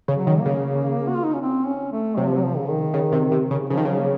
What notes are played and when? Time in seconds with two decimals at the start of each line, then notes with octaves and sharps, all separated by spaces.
0.08 C#3
0.15 F#3
0.27 D#3
0.40 A#3
0.46 C#3
1.08 F#4
1.16 F4
1.24 D#4
1.33 C#4
1.41 C4
1.66 C#4
1.92 A3
2.17 C3 F#3
2.26 F3
2.35 F#3
2.43 F3
2.57 C#3
2.69 D#3
2.94 C#3
3.12 C3
3.31 C3
3.51 C#3
3.70 C#3 F3
3.77 D#3
3.85 C#3 F#3
4.00 A#3